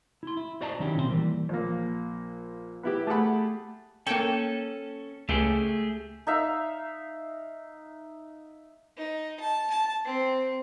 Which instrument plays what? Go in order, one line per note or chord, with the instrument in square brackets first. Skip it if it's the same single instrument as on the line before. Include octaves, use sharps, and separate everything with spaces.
[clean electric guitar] E4 C6
E4
F#4 C5 D5 D#5 A5 A#5
D#3 F#3 C#4 E4 G4
B1 A#2 C4 G4 C5
E3 G3 A#3
[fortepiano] A#1 A#3
B3 E4 G4
A3 G4 G#4 F#5 B5
[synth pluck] A#3 G5 [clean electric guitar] C#4 A4
[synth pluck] C#2 [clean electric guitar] A3 G4 G#4
[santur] D#4 E5 F5
[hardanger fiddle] D#4
A5
A5
C4